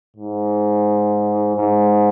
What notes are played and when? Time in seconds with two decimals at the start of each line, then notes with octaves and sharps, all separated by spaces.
0.17 G#2
1.56 G#2